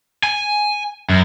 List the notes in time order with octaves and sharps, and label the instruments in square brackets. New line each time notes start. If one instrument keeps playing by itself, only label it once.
[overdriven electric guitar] G#5
F#2